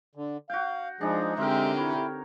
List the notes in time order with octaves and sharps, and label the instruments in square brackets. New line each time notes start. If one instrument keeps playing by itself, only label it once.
[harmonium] D3
[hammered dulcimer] F#4 G5 [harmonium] F5
[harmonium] F3 G#3 G#4 [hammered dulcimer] D4 D#4
[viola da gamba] D3 C4 G4 [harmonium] G#3 E5 [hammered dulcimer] A#4 C5
[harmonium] E4 [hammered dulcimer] C#5